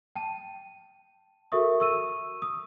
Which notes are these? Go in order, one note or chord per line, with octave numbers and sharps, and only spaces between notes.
G5 A5 D#7
F#4 A4 A#4 E5 C#6 D#6
C#6 E6 D#7
D#6